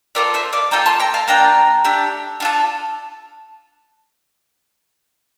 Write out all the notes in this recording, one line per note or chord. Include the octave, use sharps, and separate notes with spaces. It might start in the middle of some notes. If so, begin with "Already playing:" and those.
C4 F4 A4 A#4 D5
C5 E5
D5 F5
A#3 F4 A4 G5 A#5
A5 C6
G5 A#5
F5 A5
A#3 D4 F4 G5 A#5
A3 D4 G4
D4 F4 A4